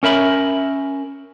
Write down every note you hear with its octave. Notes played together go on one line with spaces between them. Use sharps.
C#4 A#4 E5 B5